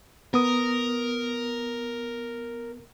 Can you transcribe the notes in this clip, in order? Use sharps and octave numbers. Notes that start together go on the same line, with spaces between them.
B3 A#4 D#6